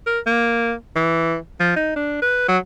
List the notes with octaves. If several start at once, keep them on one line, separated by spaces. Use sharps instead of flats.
A#4
A#3
E3
F3
D#4
D4
B4
F#3